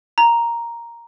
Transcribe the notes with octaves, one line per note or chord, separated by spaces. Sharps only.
A#5